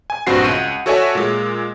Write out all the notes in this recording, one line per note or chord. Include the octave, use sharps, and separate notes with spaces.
G#5
A#1 G2 C4 F#4 C7
C#2 F#5 D#7
F#4 A4 C#5 D5 E5 G#5
A#2 G#3